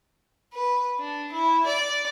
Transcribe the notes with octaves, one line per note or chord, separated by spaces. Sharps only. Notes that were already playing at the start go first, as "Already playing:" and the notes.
B4
D4
E4
D5